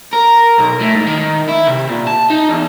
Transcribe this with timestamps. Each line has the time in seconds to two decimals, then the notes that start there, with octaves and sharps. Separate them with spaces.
0.13 A#4
0.59 B1
0.81 A2
0.95 G#2
1.07 D#3
1.49 E4
1.68 C3
1.89 A#2
2.07 A5
2.30 D#4
2.49 E2